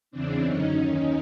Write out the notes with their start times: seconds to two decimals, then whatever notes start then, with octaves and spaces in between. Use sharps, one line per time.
0.11 E2 C#3 E3 C4 D4
0.43 F#2 D3 C#4 D#4
0.75 D#2 D#3 C#4 D#4